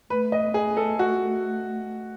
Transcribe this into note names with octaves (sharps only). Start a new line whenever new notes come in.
A3 B4
D#5
G#4
A4
F#4